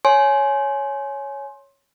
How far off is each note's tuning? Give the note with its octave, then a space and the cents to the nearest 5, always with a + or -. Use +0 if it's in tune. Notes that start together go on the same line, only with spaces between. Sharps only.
C#5 +0 G#5 +20 C6 +20